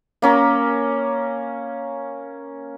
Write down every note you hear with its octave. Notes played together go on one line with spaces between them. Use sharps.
A#3 C#4 A#4